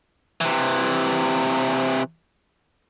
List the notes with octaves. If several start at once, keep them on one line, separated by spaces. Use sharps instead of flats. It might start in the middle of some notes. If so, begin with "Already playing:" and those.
C3 E3